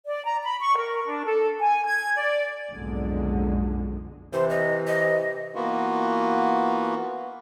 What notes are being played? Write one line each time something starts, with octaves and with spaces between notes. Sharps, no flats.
D5
A#5
B5
C#6
A#4
D4
A4
G#5
G#6
D5
F#1 B1 F2 G#2 D3 G#3
C3 E3 C5
D#5
D#5
E3 A#3 B3 F4 F#4